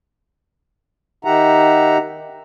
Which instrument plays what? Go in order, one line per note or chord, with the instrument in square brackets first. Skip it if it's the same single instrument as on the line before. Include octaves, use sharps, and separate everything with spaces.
[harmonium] D#3 D#4 G4 E5 F#5 A#5